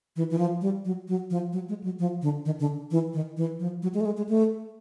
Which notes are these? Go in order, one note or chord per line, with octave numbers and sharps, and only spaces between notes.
E3
E3
F3
G3
F#3
F#3
F3
F#3
G#3
F#3
F3
D3
D#3
D3
E3
D#3
E3
F3
F#3
G#3
A3
G#3
G#3
A3